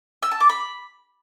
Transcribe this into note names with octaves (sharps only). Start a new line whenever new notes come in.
E6
A5
D6
B5